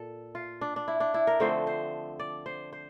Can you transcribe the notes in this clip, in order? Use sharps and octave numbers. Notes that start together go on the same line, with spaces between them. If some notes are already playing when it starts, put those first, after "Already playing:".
Already playing: A#2 A4
F4
D4
D4
E4
D4
E4
A#4
D3 F3 A3 C4 C5
C5
D5
C5
C5